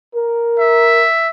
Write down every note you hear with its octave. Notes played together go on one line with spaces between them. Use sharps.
A#4
E5